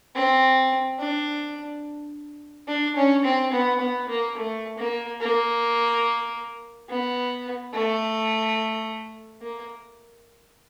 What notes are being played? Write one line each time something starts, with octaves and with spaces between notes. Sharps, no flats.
C4
D4
D4
C#4
C4
B3
B3
A#3
A3
A#3
A#3
B3
A3
A#3